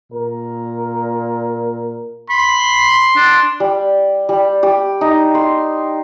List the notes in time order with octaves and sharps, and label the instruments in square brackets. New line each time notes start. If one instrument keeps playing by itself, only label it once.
[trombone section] A#2 A#4
[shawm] B5 [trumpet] C6
[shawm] D4
[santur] G3
G3
G4
D#4
C6